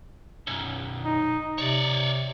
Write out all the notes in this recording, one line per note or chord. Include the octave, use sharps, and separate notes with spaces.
B1 F#2
D#4
C3 C#5 D5